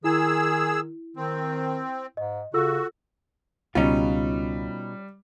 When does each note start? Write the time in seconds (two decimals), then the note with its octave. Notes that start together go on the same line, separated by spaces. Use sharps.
0.04 D#3 E4 G#4 E6
1.17 D#3 C4
2.17 G#2 D#5
2.54 C#3 F4 F#4 A4 E6
3.75 C#2 B2 G3 C#4 D#4 F4